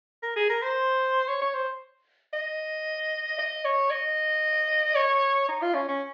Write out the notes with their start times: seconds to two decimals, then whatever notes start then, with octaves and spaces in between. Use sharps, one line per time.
0.23 A#4
0.36 G#4
0.49 A#4
0.62 C5
1.28 C#5
1.42 C#5
1.54 C5
2.33 D#5
3.38 D#5
3.65 C#5
3.90 D#5
4.95 C#5
5.48 D#4
5.62 F4
5.74 C#4
5.88 C#4